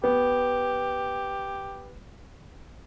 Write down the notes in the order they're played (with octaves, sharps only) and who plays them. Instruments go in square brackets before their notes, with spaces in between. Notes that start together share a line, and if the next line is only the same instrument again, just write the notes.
[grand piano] B3 [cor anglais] G4